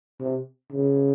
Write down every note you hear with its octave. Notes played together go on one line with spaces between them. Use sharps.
C3
C#3